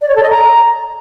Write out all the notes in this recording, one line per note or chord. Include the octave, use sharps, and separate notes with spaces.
D5
C#5
A4
D#5
A#5